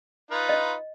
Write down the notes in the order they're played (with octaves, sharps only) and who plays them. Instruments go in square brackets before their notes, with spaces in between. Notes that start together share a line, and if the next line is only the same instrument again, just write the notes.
[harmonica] D#4 F4 B4
[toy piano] D#5